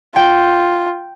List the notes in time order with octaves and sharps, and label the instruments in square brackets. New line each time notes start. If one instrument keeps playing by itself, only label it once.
[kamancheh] F4 [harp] G5